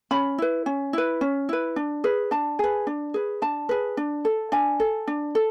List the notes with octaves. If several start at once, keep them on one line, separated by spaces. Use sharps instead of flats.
C#4 B5
E4 B4
C#4
E4 B4
C#4
E4 B4
D4
G#4 B4
D4 A5
G#4 B4
D4
G#4 B4
D4 A5
G#4 B4
D4
A4
D4 G#5
A4
D4
A4